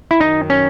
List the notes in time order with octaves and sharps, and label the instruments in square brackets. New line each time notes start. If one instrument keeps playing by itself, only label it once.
[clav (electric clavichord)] E4
[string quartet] F#2 D#3 F#3 [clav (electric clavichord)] D#4
[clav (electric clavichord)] C#4